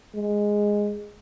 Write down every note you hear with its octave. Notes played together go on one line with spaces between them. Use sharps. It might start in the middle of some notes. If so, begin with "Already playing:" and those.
G#3